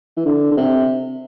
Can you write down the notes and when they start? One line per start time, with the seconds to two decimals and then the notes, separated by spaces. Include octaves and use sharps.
0.17 E3
0.25 D3
0.51 D3
0.57 C3